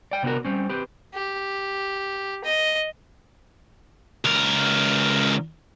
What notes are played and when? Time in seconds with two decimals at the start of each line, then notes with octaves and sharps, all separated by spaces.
0.11 D5 G5
0.23 C3 B3 D4 F#4 A#4
0.45 G3 C4 C#4
0.69 C4 G4 B4
1.14 G4
2.44 D#5
4.25 C#2 A#4